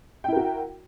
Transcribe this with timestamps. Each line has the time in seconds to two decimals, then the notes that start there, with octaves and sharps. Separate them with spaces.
0.24 G5
0.28 E4
0.32 A#4
0.36 F#4